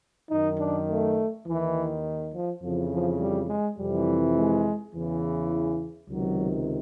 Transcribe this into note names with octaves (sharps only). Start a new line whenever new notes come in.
F#2 D#3 D#4
D4
A3
D#2 D#3 E3
F3
F2 C#3 E3 F3
F3
G3
G#3
F2 C3 E3 G3
G#3
E2 C#3 E3
C#2 C3 D#3 F#3